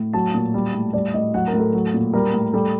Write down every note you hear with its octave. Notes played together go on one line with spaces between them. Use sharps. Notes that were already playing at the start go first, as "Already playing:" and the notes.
Already playing: A2
F#3 A5
A#2
G3
A2
G3 D5
A2 D#5
F#3 F#5
A#4
A2
A4
F#3
A#2
G3 A#4
A2
G3 A4